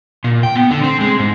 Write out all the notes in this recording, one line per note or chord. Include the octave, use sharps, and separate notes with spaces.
A#2
G5
B3
D3
C4
G#3
G#2